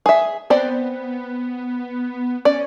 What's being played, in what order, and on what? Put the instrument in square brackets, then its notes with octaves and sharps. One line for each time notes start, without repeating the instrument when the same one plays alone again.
[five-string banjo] G#4 E5
[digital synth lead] B3 [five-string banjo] C4 C5 D5
[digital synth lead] C#4 [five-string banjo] D5